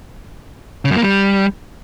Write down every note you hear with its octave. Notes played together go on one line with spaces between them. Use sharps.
C#3
F#2
A#3
G3